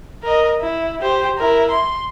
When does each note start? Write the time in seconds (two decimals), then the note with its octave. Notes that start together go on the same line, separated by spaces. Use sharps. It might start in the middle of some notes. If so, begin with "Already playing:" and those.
0.23 A#4 D#5
0.61 E4
1.02 G4 C5
1.38 E4 A#4
1.70 C6